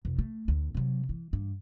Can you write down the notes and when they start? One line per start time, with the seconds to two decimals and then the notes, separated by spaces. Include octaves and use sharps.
0.05 F1
0.19 A3
0.48 D2
0.75 C3 F#3
1.09 E3
1.33 G2